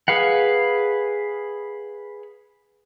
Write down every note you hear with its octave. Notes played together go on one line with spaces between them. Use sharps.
G#4 B4 F5 F#5